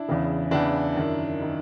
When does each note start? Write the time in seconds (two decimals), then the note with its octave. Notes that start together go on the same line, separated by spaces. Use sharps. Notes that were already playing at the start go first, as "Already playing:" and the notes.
Already playing: D4 E4
0.08 E2 C#3 E3
0.51 E2 C#3 E3 D4 E4
0.95 F#2 D#3
1.42 D#3